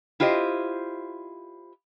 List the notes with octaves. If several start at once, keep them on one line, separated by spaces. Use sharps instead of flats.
E4 F4 G4 C5 D#5